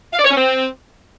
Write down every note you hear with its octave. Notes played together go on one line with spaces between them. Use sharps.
F5
D5
C#5
C#4
C4